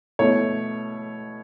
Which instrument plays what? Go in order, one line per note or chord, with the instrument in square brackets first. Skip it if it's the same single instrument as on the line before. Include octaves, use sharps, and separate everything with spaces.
[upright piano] B2 A3 E4 C#5